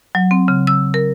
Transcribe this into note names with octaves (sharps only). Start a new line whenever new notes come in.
F#3
C4
C#3
E6
A#4